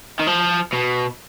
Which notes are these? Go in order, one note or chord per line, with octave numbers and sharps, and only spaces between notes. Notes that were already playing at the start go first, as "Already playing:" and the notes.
D#3
F3
B2